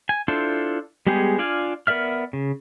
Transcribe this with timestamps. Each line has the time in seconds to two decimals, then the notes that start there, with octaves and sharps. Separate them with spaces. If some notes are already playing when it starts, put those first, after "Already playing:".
0.09 G#5
0.28 D4 E4 F4 A4 C5
1.07 G3 G#3 B3 G4 G#4
1.38 D4 F4 D5 F5 G#5
1.87 B3 A#4 D5 E5 F6
2.33 C#3